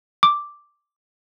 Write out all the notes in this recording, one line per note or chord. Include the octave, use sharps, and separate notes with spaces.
D6